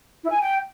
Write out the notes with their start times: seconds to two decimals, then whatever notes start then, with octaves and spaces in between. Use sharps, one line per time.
0.22 E4
0.31 G#5
0.39 G5